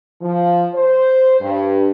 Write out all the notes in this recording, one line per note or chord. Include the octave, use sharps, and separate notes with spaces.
F3
C5
G2